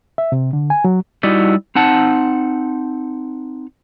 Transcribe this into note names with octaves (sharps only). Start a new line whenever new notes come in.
E5
C3
D3
G#5
F#3
G3 D#4 E4 F#4 D5 D#5
C4 D#4 F#5 A5